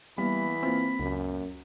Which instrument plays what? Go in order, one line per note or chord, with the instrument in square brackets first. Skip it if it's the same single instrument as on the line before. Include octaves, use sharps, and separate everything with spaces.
[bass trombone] E3 [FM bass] G3 [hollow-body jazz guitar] A#3 B3 [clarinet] B5
[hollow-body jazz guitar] A#3 F4 E5 [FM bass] C4
[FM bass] C#2 [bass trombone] F#2